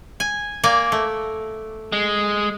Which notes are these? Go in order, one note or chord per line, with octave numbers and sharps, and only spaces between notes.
G#5
A#3 D5 G#5
A3
G#3